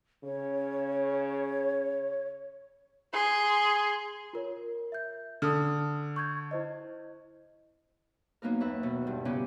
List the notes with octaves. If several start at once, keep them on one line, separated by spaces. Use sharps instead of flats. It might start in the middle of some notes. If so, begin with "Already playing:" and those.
C#3 C#5
G#4 C6
F4 A#4 C#5
E5 G6
D3 D#6 F6
C#6 G6 G#6
E4 C5 D#5
F#2 A#3 B3 D#4 A#4
D#2 B4 E5
B2
G2
A#2 C#3 B3 C#4 G4